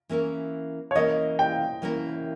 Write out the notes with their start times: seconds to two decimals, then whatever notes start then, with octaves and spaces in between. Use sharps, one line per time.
0.09 E3 A#3 C#4 E4 A#4
0.91 C#5
0.95 E3 A#3 C#4 E4 A#4 D#5
1.39 G5
1.82 E3 A#3 C#4 E4 A#4